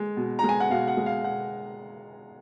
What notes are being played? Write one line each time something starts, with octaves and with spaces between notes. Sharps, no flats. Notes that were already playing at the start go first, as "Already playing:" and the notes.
Already playing: G#3
B2
G#3 A#5
G#5
F#5
B2 F5
F#5
G#3
F5
B2 F#5